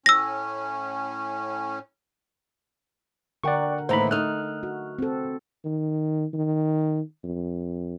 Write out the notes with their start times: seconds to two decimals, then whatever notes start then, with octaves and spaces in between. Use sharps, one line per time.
0.06 A2 C#4 E6 A#6
3.44 D3 A#4 D5 F#5 G5 C#6
3.89 D#2 A2 E3 C5 A#5 B5
4.11 A3 D#4 F6 F#6
4.63 F#4
4.99 C4 A4
5.65 D#3
6.33 D#3
7.24 F2